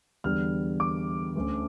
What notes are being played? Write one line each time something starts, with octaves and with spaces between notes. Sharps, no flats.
E2 D3 G3 F6
D6
D2 D3 A3 C#4